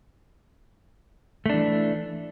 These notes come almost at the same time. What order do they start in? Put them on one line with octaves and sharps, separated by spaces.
A3 D4 E3